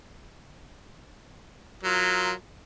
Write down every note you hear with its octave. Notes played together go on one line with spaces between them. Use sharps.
F#3 F4 A#4